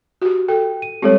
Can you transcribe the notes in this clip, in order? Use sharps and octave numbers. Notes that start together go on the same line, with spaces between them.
F#4 G4
A4 G5
D#7
G3 G#3 C4 G4 A4 C#5